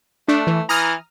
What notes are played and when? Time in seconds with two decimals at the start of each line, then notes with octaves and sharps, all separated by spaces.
0.28 A3 D4
0.47 E3
0.69 E3 A#5 D#6 F6